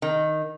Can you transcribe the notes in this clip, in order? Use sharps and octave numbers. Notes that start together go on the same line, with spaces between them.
D#3